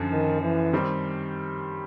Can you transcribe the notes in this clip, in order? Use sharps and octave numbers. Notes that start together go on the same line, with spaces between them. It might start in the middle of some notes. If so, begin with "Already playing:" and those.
Already playing: F#2 D3 F3
D#3
E3
D#3 G3 C4